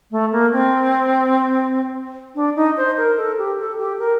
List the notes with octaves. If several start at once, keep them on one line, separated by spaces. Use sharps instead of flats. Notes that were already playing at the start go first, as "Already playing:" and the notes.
A3
A#3
C4
D4
D#4
C5
A#4
A4
G4
A4
G4
A#4